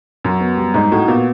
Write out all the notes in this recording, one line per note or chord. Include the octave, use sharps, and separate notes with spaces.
F#2 F#4
B3
G3
G#2 D#4
A2 F#4
A#2 B3